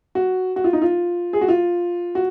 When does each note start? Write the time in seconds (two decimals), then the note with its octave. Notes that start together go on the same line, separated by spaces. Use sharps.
0.15 F#4
0.56 F#4
0.64 F4
0.73 D#4
0.82 F4
1.33 G#4
1.41 F#4
1.48 F4
2.15 F#4